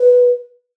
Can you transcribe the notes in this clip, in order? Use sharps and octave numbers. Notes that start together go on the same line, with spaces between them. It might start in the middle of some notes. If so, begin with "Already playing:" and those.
Already playing: B4